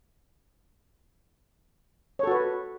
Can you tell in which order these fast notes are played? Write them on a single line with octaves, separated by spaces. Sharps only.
C#5 A4 F#4 B4